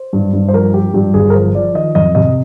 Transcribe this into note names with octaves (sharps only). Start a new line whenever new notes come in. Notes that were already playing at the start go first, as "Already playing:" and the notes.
Already playing: C5
G2
G2
C5
F3 A#4
F3 G4
G2 G4
G1 G#4
A#4
F3 C5
F3 D5
D#3 D#5
F2 D#5
C3 D#5